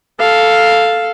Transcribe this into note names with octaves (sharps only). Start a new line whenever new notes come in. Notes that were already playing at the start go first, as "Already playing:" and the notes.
A4 F5